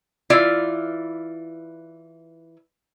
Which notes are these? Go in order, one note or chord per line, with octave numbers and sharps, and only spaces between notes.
E3 E4 F4 D5